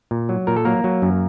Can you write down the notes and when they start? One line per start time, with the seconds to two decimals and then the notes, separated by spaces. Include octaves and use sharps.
0.11 A#2
0.29 F#3
0.47 A#2 A#4
0.57 A4
0.65 F#3 A#3 A#4
0.84 F#3
1.02 F#2